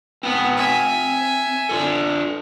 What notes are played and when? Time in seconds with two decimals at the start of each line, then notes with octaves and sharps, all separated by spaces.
0.23 B3 C4 F#5 A5
0.57 E5 G#5
1.69 D4 F4 A4